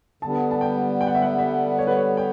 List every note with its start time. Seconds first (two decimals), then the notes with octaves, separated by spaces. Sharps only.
0.22 D3 G3 B3 A5
0.51 A5
0.61 G5
1.01 G5
1.07 F#5
1.15 E5
1.22 F#5
1.38 E5
1.78 C#5
1.87 B4
1.96 C#5
2.17 G5